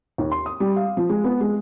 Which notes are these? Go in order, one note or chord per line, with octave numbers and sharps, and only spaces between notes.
D#2
C6
D#6
G3
F5
F3
G#3
B3
G#3